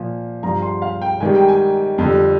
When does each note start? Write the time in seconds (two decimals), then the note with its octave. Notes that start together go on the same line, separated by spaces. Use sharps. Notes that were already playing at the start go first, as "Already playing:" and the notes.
Already playing: A#2 F3
0.43 G2 F3 A#5
0.62 C6
0.82 F5
1.02 G5
1.20 G#2 D#3 G3 G#5
1.35 G5
1.48 G#5
1.98 F2 D3 G3